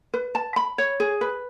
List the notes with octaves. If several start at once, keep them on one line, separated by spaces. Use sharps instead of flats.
B4
A5
B5
C#5
G#4
B4